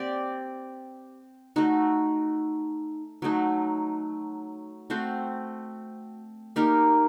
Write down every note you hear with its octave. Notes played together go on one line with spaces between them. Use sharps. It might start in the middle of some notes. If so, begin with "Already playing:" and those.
Already playing: C4 G4 D5
A3 D#4 F#4
F#3 A3 D#4
A3 C4 F#4 C5
A#3 D#4 G4 A#4